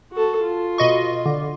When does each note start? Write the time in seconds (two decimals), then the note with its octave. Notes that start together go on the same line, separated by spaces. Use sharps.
0.12 F#4 A4
0.42 F4
0.78 B2 D#5 C#6
1.26 D3